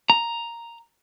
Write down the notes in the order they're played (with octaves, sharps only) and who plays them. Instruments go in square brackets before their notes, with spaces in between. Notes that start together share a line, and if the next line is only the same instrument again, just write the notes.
[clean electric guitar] A#5